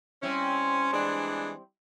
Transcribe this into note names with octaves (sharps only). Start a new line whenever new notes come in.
G3 C4 C#4 E4
E3 G#3 D4